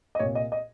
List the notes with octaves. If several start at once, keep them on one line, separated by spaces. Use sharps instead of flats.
D#5
C2 A#2 C#5
D#5
D#5